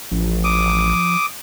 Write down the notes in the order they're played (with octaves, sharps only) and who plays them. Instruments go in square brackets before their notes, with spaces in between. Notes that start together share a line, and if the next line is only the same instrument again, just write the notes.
[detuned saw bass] A1 [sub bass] F3
[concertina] D6 D#6